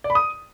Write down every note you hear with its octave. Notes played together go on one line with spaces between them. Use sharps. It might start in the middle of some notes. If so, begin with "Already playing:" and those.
D5
B5
D#6